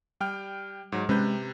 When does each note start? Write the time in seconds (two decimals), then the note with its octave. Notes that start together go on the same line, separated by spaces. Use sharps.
0.20 G3 G5 F6
0.92 G#2 F#3
1.09 C3 G#3 C#4 B4 G6